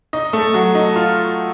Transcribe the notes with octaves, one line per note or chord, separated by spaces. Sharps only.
D#4 D#5
A3 A4
F#3 F#4
D#4
F4